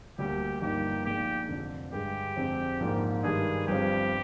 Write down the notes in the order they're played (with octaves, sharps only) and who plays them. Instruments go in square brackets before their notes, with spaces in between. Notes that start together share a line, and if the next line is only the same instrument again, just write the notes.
[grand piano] D2 D3 G3 A#3 [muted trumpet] G4
[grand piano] G1 G2 F3 A#3 D#4 [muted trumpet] G4
[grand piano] A#1 A#2 G#3 D#4 [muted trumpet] G4
[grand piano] F1 F2 D3
[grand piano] G2 D3 G#3 [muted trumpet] G4
[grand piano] F2 D3 G#3 C4
A#1 G#2 F3 A#3 F4
[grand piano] G2 D#3 G#3 D4 [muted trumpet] G#4
[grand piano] G1 G2 F3 C4 [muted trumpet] G4